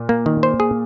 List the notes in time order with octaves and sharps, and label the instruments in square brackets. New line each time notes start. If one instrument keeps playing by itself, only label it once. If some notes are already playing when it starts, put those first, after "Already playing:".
Already playing: [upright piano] A#2
[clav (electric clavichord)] A#3
D#3
C5
G#4